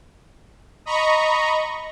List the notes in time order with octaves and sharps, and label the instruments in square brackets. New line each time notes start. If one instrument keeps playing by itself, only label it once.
[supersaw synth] D#5 A#5 B5 C#6